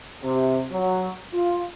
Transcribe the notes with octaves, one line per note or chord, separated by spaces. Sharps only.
C3
F#3
F4